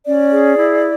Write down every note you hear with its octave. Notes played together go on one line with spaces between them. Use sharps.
C#4 D5
G#4
E4